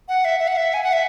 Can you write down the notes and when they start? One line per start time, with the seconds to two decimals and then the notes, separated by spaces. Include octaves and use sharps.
0.09 F#5
0.25 E5
0.40 E5
0.48 F#5
0.57 E5
0.74 G#5
0.83 F#5
0.93 E5